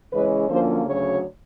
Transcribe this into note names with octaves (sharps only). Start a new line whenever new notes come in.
C#3 E3 G#3 C#4 B4
F#2 D3 F3 A#3 C#4 C5
D2 C#3 F#3 C#5